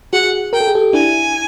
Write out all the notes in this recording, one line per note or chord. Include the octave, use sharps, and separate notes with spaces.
F#4 G#4 F#5
A#4 G5
A4
G#4
G4 A4
D4 E4 G#5